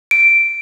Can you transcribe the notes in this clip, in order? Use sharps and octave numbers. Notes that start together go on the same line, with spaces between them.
D7